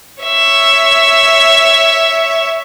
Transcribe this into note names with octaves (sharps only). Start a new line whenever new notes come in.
C#5 E5